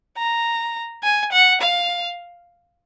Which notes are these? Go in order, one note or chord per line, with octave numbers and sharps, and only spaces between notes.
A#5
G#5
F#5
F5